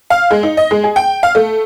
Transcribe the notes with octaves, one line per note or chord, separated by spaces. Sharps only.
F5
G#3
D#4
D#5
G#3
G#4
G5
F5
A3